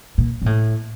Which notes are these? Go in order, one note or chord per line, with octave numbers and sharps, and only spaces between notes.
A#2
A#2
A2